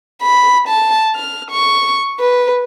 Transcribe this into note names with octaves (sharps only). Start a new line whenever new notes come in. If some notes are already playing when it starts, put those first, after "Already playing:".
B5
A5
F6
C#6
B4